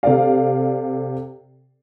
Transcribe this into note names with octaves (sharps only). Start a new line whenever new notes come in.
C3 A4 D5 F5